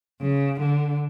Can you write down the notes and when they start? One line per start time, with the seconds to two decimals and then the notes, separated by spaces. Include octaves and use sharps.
0.21 C#3
0.60 D3